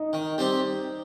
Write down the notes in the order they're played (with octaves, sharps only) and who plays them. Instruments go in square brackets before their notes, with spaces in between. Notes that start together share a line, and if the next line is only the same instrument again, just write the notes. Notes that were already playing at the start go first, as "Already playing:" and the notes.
Already playing: [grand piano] D#4
[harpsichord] D#3
G3 C4 G4